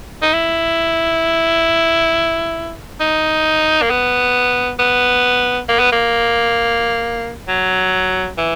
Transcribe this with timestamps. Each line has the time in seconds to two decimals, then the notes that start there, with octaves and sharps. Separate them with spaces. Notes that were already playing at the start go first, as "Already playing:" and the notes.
0.22 D#4
0.33 E4
3.01 D#4
3.82 A#3
3.90 B3
4.79 B3
5.69 A#3
5.80 B3
5.92 A#3
7.48 F#3
8.38 E3